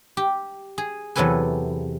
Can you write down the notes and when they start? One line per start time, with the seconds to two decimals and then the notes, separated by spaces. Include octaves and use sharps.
0.17 G4
0.78 G#4
1.15 E2 C3 F#3 A4 B4 G#5